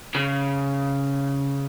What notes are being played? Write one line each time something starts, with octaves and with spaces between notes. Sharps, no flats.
C#3